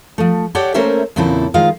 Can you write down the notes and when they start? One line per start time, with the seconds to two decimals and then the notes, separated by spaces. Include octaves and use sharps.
0.18 F3 A3
0.55 G4 A4 C#5 D5 F#5 G5
0.74 A3 A#3 C#4 A#4 C5 E5
1.16 E2 A#2 C#3 C4 E4 A4
1.54 D#3 G#3 F4 C5 F5